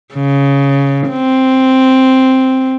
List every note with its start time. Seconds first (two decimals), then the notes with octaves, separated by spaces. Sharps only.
0.14 C#3
1.10 C4